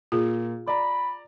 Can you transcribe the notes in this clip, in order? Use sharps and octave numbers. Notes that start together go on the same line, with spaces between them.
A#2 F4 G#4
D5 A#5 B5